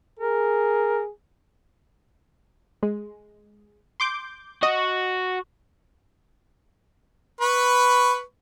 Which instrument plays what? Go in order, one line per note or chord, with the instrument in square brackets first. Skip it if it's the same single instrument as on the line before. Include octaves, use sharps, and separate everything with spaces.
[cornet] G#4 [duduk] A#4
[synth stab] G#3
C6 D6 G6
[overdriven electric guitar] F#4 [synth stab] D#5
[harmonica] B4 B5 C#6